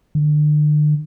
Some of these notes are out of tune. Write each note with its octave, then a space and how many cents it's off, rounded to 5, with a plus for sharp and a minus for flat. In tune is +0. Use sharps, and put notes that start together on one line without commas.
D3 +35